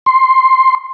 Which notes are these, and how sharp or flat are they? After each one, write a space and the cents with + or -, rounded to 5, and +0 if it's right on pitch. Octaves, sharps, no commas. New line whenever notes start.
C6 +5